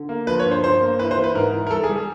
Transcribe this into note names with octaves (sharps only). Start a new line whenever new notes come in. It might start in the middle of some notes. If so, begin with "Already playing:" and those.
Already playing: D3
A#3
F3 B4
C#5
G2
C5
G2 C5
A#3
E3 B4
C5
E3
B4
G#2 A#4
E3
A#4
G3 A4
G#4
G3
G#4